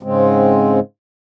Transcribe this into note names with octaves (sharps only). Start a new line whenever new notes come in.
G#2 C#3 G#3 C4